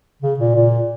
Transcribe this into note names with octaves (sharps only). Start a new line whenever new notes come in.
C#3
A#2
A#2